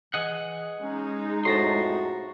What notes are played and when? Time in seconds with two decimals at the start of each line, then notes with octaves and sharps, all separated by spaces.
0.14 E3 G#4 D#5 F#5
0.81 G#3 C#4 D#4
1.45 F2 A2 F#4 A5 A#5 C6